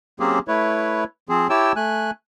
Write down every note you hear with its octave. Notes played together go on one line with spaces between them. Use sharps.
F#3 A#3 C4 C#4 G4 G#4
A3 E4 B4 C#5
F3 C4 G#4
E4 G4 C#5 G5 A5 E6
A3 G#5 F#6